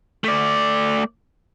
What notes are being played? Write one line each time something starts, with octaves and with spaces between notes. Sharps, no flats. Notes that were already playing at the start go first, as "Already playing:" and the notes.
A3 D5